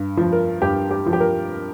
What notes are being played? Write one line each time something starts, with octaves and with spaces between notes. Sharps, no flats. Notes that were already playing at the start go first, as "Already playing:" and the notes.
Already playing: G2
F3
A#4
G2 G4
G4
F3
G4
A#4